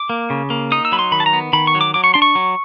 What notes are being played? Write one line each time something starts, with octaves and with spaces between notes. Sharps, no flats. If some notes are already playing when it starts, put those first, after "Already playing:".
Already playing: D6
A#3
C#3
A#3
D#4 D#6
E6
F#3 B5
C6
D#3 B5
A5
A#5
B3
D#3 B5
C#6
F#3
D6
F#3 D6
C#6
D4 C6
C#6
F#3